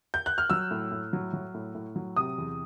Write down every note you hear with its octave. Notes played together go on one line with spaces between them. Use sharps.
G6
F#6
F6
F#3 E6
A2
A2
F#3
F#3
A2
A2
F#3
C3 D#6
E2